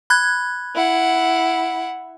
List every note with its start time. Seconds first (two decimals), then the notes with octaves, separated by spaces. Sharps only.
0.10 B5 F#6 G#6
0.75 E4 F#5